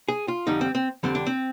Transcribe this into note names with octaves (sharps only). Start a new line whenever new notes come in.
G#4
F4
F2 D3 G3 D#4
C4
C4
F2 D3 G3 C4
D4
C4